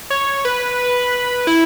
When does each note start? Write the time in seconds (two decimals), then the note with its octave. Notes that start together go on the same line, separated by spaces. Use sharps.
0.10 C#5
0.45 B4
1.47 E4